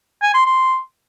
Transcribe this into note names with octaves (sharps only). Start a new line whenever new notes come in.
G#5
C6
C6